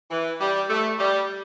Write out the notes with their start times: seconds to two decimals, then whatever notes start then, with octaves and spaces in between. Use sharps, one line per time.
0.11 E3
0.40 G3
0.69 A3
0.99 G3